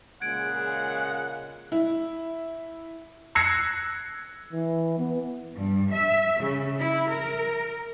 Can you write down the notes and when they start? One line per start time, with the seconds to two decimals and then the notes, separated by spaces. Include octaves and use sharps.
0.21 A#2 C#3 G#3 F#5 G#6 D7
1.72 E4
3.35 E6 F#6 G#6 A#6 C7 C#7
4.53 E3
4.98 B3
5.55 G2
5.91 E5
6.38 C#3
6.80 E4
7.10 A#4